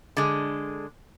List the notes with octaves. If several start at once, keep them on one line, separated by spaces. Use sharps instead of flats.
D3 G#3